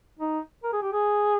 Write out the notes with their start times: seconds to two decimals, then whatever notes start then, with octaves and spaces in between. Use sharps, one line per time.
0.19 D#4
0.64 A#4
0.73 G#4
0.82 G4
0.93 G#4